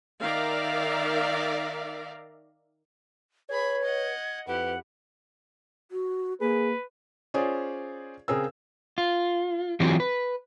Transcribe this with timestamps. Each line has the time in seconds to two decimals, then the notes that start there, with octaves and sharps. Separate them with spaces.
0.21 D#3 A#4 D5 E5 F5 A#5
3.50 G#4 B4 C#5 B5 G#6
3.82 D#5 F#5
4.48 F2 E4 G4 B4 F#5
5.91 F#4
6.41 A#3 G#4 B4
7.34 C#4 F4 G#4 C5 D5
8.28 C#3 C4 G#4 A#4 E6
8.98 F4
9.80 E3 F#3 C4 F4 G4 G#4
10.00 B4